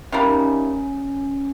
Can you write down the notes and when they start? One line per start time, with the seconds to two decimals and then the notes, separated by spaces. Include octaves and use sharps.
0.12 C3 G3 A#3 C#4
0.23 D#4
0.34 C#4